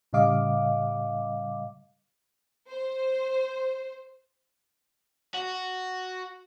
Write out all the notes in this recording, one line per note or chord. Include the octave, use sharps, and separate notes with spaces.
A2 C#3 G3 D#5 F5 D6
C5
F#4